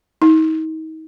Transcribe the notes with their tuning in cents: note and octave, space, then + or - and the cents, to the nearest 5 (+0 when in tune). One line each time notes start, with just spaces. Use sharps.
D#4 +35